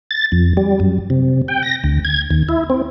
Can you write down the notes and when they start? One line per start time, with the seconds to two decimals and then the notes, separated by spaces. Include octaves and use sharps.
0.11 A6
0.32 F2
0.57 G3
0.80 F#2
1.10 C3
1.48 G5
1.63 A#6
1.84 D2
2.05 G#6
2.31 D#2
2.49 E4
2.70 C4